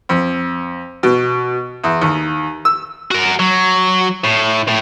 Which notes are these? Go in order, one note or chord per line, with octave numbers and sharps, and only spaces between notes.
F2
B2
E2
D#2
E6
F#4 A#4
F#3
A2
A2